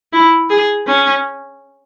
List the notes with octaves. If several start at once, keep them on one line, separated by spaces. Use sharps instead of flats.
E4
G#4
C#4